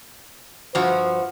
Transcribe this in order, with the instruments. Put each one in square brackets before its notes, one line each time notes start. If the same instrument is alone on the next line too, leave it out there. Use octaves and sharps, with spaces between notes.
[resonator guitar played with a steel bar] G2 F3 F#4 [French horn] C5